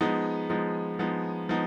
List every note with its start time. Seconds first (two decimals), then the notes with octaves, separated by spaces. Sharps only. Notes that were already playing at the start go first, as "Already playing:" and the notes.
0.01 F3 G#3 B3 D#4
0.50 F3 G#3 B3 D#4
0.99 F3 G#3 B3 D#4
1.49 F3 G#3 B3 D#4